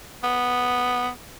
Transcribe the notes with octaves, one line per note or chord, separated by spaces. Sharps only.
B3